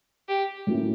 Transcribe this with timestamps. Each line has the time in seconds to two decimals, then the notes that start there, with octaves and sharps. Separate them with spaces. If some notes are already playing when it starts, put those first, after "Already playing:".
0.29 G4
0.67 A2 F#3 A#3 C#4 E4